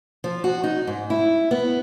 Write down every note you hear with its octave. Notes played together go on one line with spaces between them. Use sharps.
F3
F#4
D#4
G#2
E4
B3